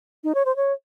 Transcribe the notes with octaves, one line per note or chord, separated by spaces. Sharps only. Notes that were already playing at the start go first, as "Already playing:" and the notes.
D#4
C#5
C5
C#5